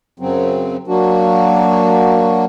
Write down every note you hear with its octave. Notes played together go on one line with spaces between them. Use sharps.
F#2 C#3 F#3 C4
F#3 A#3 D4 F#4